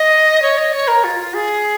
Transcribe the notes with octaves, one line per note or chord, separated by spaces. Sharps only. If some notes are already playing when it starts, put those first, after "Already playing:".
Already playing: D#5
C#5
D#5
C#5
A#4
F4
F4
G#4